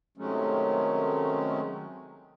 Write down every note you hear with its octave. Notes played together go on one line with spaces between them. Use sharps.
C3 D#3 F#3 G#3 A3 C#4